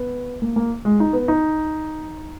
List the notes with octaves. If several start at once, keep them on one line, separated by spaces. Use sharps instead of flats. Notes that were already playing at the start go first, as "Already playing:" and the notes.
Already playing: B3
A#3
A#3
G#3
D#4
B3
D#4